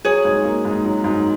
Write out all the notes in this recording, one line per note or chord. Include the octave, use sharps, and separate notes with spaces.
F#3 G#4 C#5
G#2
A#3
G#2
F#3
G#2